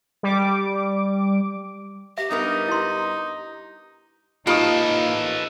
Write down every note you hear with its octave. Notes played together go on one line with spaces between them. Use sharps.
G3 D6
G4 E5
G2 B3 D#4 A#4
E4 C6
A#3 D#4 F4 G4 A4 B4 D#6